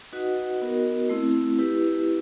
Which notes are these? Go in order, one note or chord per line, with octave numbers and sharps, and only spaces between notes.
D#4 F#4 B4 D#5 F#5
B3 D#4 F#4 A#4 D#5
A3 C4 E4
E4 G4 B4